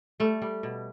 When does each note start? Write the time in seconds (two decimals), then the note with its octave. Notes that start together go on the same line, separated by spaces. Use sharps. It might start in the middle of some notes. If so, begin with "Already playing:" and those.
0.20 G3 A3
0.42 G3
0.63 B2